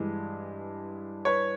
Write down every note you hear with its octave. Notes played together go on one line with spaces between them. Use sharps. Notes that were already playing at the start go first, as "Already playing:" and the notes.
Already playing: G2 E3 G#3
B4 C#5